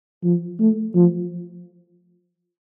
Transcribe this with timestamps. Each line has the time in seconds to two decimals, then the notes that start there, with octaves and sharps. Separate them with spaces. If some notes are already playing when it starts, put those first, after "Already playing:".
0.24 F3
0.59 A3
0.95 F3